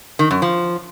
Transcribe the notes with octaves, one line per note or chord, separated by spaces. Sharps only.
D#3
F#2
F3